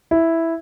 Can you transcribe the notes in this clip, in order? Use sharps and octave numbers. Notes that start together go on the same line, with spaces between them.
E4